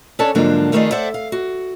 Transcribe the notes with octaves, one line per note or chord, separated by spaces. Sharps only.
C#4 D4 A4 C#5 D5 A5
G#2 D3 F3 F#3 A#3 D4
F2 D#3 A3 F4 G#4 D5
A4 C5 D5 E5 F#5
F5
F#4